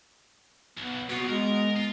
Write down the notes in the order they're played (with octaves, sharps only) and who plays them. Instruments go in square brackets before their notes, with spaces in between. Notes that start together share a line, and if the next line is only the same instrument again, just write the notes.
[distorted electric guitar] B1 [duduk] B3
[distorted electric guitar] C#3 F4 [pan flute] B3 [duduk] F#4
[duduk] G#3 [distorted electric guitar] A#4
[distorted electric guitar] F4